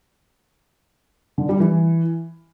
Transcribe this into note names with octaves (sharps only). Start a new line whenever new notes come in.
D3
G3
E3